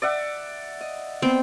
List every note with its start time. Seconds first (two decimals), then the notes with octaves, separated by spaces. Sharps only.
0.02 D5 E5 F#5
0.81 D#5
1.22 B3 C4